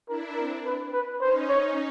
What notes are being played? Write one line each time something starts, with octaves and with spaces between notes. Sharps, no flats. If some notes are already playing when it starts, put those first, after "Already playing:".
D4 E4 A#4
C4 D4 A#4
B4
B4
C#4 D#4 C5
C#5